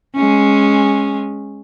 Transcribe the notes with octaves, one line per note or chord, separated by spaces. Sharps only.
G#3 C#4